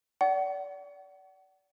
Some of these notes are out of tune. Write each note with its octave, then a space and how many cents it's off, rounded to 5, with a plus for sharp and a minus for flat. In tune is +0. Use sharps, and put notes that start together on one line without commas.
D5 -25 F#5 +35